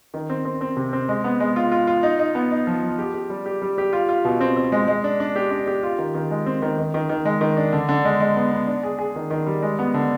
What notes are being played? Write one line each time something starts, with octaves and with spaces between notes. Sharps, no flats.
D#3
C4
C4
C4
C3
C4
G#3
B3
G#3
F4
F4
F4
D#4
D#4
B3
D#4
F3
F3
G4
G4
G3
G4
G3
G4
F4
F4
B2
C4
C4
G#3
G#3
D4
D4
G4
D4
G4
F4
D#3
D#3
G#3
C4
D#3
D#3
D#3
D#3
G#3
D#3
D4
D3
D3
G#3
G#3
B3
B3
D4
G#4
G#4
D#3
D#3
G3
G#3
B3
D3